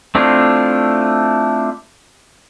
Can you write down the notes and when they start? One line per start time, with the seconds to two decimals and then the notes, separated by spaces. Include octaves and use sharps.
0.15 A3 C4 D4 E4 F4